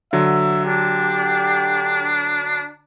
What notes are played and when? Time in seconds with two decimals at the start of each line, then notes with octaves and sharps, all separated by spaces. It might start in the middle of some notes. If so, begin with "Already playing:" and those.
0.13 D3 F#3 E5
0.65 D4 G4